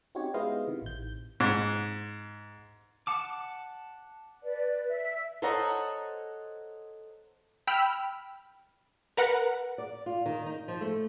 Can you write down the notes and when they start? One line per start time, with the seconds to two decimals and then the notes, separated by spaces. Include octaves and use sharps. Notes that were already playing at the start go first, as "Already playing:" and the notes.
0.15 C4 C#4 D#4 F#4 G4 C#5
0.34 G#3 B3 E4 C5 D#5 F5
0.68 C3 D#3
0.82 A1 G6
1.40 G#2
3.07 F#5 A5 D6
4.43 B4 D5
4.88 E5
5.42 A4 C5 C#5 D#5 F#5 A#5
7.67 G5 B5 E6 F6
9.17 A#4 B4 F#5 A#5
9.78 D5
10.06 F4
10.26 D#3
10.46 D#4
10.68 F3
10.81 A3